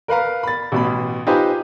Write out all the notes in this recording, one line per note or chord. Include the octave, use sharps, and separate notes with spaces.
A#4 B4 F5 A#5
B5 A6
A1 B2 B5
D#4 F4 G4 B4 C5 G#5